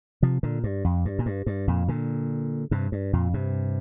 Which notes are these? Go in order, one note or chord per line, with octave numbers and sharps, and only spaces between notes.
C3 F3
A#2 D3
G2
F2
G2
A#2
G2
G2
F2 A#2
A#2 D3
G2 C3
G2
F2 A#2
G2 C3